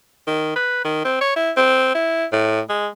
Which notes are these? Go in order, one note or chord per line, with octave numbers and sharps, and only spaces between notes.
D#3
B4
D#3
C4
C#5
E4
C4
E4
A2
G#3